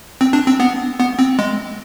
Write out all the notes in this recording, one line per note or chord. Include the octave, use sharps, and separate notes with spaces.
C4
D4
C4
B3
B3
C4
G#3